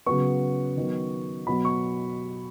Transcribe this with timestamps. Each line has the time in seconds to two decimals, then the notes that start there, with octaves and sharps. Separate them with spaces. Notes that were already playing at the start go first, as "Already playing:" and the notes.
0.06 C#3 F#3 B3 C#6
0.77 D#3 F#3 B3
1.47 B2 F#3 B3 B5
1.65 C#6